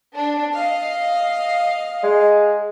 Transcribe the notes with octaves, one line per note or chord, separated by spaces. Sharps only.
D4
D#5 F5
G#3